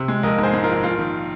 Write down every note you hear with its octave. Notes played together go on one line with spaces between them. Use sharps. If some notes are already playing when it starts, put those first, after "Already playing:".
Already playing: C3
G#3
A#1 A#4 D#5
G#2 G#4 C5
G#2
F4 A#4
A#1
A#1 F4 A#4
D#3